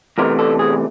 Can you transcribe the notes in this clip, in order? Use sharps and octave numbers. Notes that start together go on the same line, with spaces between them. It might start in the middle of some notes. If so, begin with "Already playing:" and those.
E2 C3 E3 A3 A#4
A4
G#4